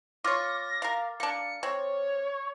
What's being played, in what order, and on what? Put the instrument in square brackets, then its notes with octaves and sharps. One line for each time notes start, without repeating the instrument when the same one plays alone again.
[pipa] F4 C#5 [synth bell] D6 F6 A6 [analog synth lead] A#6
[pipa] A#4 F5
[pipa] A#3 D4 [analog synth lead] C#7
[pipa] C4 [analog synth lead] C#5